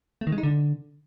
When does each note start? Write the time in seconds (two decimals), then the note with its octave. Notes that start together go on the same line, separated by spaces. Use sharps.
0.21 A3
0.27 D#3
0.32 G#3
0.38 D#4
0.43 D3